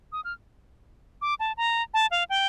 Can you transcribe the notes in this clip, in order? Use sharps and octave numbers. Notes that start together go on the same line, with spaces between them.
D#6
F6
D6
A5
A#5
A5
F5
G5